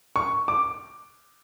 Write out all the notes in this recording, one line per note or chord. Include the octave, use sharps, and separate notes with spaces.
C#6
D6